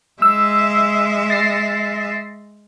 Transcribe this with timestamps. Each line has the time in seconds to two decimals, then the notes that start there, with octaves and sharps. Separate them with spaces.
0.22 G#3 E5 E6
1.30 A6 A#6 C7